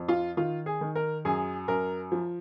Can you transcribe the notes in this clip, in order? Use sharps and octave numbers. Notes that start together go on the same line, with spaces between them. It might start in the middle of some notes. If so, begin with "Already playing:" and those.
Already playing: F2
F4
D#3 F4
G#4
D#3
A#4
F#2 G#4
F#2 A#4
F3